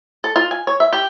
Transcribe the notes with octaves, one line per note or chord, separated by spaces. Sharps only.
A4
F4
G#5
C#5
E5
G4